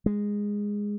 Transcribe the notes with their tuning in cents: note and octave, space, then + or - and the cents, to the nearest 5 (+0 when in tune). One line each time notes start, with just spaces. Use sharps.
G#3 -10